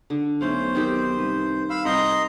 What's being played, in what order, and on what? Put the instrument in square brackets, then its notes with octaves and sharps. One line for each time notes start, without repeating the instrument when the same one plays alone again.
[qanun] D3
[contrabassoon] B1 [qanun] A3 C#4 F5 [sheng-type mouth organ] C5
[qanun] D#3 C4 G4
[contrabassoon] C2 [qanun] B4
[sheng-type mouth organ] F5 B5 E6
[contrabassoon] C2 [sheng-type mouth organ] D#5 A#5 C6 [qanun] F#5 G5